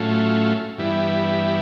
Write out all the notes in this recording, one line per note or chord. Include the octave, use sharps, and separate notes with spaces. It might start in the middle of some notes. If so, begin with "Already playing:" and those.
Already playing: A2 F#3 A3 C#4 F4
G2 E3 G3 B3 E4